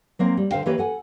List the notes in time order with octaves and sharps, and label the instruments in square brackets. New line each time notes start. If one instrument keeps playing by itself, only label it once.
[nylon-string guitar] F#3 A#3 C4
G3
D3 C5 F5 G5
E3 A#3 G4 B4 C#5
A4 F#5 G#5